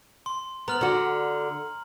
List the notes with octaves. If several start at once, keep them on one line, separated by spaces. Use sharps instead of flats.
C6
B3 A#5 F6 F#7
D3 F#4